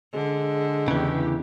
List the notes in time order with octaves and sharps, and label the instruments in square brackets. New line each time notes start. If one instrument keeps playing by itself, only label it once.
[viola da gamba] D3 [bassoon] G#3
[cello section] E2 G4 [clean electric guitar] C#3 E3